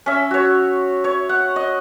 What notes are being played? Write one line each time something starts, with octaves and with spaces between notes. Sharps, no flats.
C#4 E5
F#4 C#5
C#5
F#5
D#5